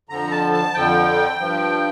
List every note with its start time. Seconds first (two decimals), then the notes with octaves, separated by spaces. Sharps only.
0.09 F2 D3 F3 A#5
0.31 A5
0.53 A5
0.74 F2 D3 F3 G5
1.39 G2 F3